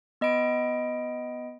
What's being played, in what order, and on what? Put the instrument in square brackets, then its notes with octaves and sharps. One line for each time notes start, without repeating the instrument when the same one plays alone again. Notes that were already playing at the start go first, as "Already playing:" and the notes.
[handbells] B3 D#5 B5 D7